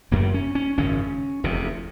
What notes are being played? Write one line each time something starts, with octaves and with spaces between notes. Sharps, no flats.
F#1 F#2 C#3 A#3
C#4
C#4
G#1 F#2 C#3 C#4
F1 E2 C3